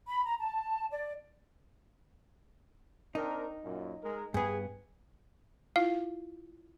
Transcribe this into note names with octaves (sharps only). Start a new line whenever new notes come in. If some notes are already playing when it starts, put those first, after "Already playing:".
B5
A#5
A5
D5
C4 D4 D#4 A#4
F#2 A#2
G#3 A#4
G2 B3 G#4
E4 F4 F5